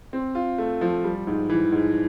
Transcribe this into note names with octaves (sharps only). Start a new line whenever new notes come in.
C4
F4
A3
F3
G3
G#2
E3
G#2